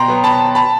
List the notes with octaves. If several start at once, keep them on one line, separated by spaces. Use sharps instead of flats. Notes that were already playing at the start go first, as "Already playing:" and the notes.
Already playing: B2 G5 A#5 C6
F#3 B3
A5 B5
A5 B5